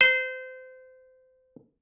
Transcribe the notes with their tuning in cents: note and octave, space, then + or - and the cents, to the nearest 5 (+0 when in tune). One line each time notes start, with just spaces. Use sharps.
C5 -25